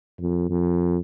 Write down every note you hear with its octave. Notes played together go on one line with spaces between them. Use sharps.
F2
F2